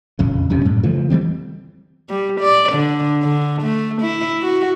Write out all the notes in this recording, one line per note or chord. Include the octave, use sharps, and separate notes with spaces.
E1 A#1 F2 C#3
D#1 F2 C3 C#4
F#2 A2 G3
C#3 E3 F3 A3
E3 F#3 G3 C4
G3
D5
D3
D3
A3
E4
F#4